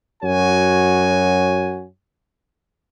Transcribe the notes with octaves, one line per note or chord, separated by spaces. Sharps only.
F#2 F#4 C#5 G#5